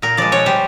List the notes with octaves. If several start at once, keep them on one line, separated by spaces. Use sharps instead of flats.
A#2 A#4
F3 G#3 D5
B2 C#5
G3 C5